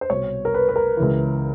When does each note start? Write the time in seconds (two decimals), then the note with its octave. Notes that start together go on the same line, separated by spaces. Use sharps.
0.01 C5
0.10 C2 B2 C#5
0.45 A#4
0.54 B4
0.69 B4
0.76 A#4
0.97 C#2 C#3 E3